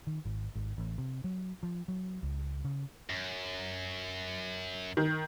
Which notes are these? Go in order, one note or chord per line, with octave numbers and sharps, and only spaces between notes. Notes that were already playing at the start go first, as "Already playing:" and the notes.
D#3
G#1
G#1
A1
C3
F#3
F3
F#3
C#2
C#3
F#2
D#3